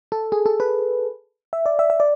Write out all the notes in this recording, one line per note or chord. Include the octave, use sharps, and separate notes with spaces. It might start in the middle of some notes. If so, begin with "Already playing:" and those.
A4
G#4
A4
B4
E5
D5
E5
E5
D5